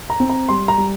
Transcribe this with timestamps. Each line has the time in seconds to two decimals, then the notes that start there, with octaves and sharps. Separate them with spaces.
0.10 A#5
0.20 C4
0.30 A#5
0.49 G3 C6
0.68 A#5
0.78 G3